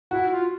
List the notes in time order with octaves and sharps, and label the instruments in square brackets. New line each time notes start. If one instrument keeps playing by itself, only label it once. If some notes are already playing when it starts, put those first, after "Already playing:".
[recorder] E4 [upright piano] F#4
[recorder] F4